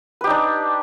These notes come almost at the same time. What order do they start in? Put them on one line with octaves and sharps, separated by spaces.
B4 G4 D#4 D4